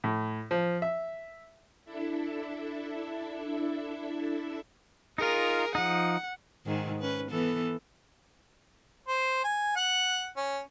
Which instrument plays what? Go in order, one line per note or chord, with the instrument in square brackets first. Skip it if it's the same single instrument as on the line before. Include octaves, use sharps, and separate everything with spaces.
[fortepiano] A2
F3
E5
[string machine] D4 E4 A4 E5
[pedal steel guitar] D#4 F4 [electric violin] G#4 A#4
[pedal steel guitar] F3 D#4 [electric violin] F#5
[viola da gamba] G#2 D#3 G#4
C#4 B4
E3 B3 A4
[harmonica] C5
G#5
F#5
C#4